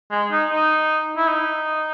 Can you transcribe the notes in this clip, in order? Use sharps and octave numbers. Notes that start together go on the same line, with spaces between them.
G#3
D#4
D#4
E4
D#4